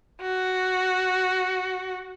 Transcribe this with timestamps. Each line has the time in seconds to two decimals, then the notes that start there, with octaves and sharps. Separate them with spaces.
0.22 F#4